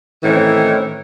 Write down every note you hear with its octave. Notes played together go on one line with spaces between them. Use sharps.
A2 D#3 E3 C4 C#4